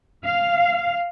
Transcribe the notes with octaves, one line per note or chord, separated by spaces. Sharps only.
F5